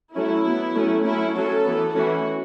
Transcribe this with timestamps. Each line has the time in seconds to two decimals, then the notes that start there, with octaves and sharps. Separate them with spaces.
0.15 F#3 A3 C#4 E4
0.45 F#3 B3
0.75 F#3 A3 C#4
1.05 F#3 A3 C#4 E4
1.34 F#3 C#4 A4
1.64 E3 B3
1.94 E3 A3 C#4 F#4